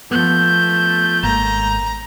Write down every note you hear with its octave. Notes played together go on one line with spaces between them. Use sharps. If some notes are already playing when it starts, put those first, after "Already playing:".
F3 A3 B3 G6
G#1 A#3 A#5